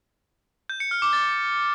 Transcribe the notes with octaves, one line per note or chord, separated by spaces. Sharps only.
G6
C#7
F6
D6
A6